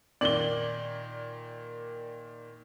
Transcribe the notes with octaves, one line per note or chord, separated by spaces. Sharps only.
A#2 D#3 A#3 D5 F#7 G7